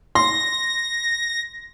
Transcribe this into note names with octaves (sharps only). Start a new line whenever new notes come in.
C6 A#6